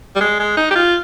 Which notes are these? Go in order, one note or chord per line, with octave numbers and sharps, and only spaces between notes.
G3
G#3
G#3
D#4
G4
F4